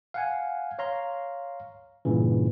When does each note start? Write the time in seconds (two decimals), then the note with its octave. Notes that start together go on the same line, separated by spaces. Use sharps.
0.14 F5 F#5 G#5
0.79 C#5 F5 A#5 C6
2.05 G2 A#2 C#3 E3